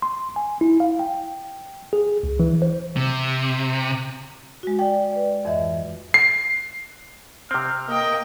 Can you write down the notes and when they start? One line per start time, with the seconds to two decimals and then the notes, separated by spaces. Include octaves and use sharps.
0.02 C6
0.36 G#5
0.61 E4
0.80 F5
0.99 G5
1.93 G#4
2.23 C#2
2.40 E3
2.62 C5
2.96 C3
4.63 G#3 F#4
4.79 D5 G5
5.13 B4 D5
5.45 F2 G#2 E3 D#5 E5
6.14 C7
7.51 C3 C4 F6
7.88 A#3 D#5 G5